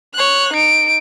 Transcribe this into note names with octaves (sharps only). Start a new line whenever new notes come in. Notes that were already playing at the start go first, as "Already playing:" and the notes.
C#5 F#6
D#4 D7